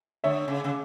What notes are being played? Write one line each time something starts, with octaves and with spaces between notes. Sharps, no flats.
D3 C#5 E5
C#3
C#3